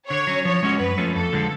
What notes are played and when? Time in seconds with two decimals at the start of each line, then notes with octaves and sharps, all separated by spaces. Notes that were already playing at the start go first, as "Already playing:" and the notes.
0.10 D3 C#5
0.27 F#3 C#4
0.45 F3 C#5
0.63 G#3 C#4 F#4
0.79 F#2 B4
0.98 F3 A3 C#4
1.15 F2 A4
1.33 D3 F3 G#3